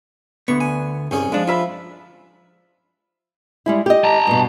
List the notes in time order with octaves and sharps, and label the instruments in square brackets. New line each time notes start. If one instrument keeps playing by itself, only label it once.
[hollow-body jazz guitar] D2 D3 B3 [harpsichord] C#6
[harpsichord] G#5
[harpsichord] C2 C#4 G#4 [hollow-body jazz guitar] G2
[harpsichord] F3 [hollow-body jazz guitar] G#3 D4
[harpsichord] F3 [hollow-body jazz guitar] F4 E5 B5
[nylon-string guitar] G3 G#3 E4
G4 D#5
[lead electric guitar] A5 A#5
[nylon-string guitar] G2 B2